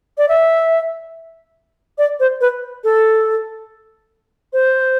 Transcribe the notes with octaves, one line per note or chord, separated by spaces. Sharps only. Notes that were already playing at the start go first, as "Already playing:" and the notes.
D5
E5
D5
C5
B4
A4
C5